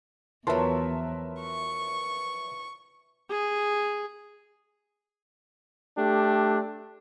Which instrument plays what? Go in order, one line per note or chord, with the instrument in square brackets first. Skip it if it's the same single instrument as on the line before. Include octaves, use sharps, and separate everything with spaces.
[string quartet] E2 [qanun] F3 F#3 [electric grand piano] A#4 B4 E5 [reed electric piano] A5 C6
[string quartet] C#6
[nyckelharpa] G#4
[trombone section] A3 D4 G4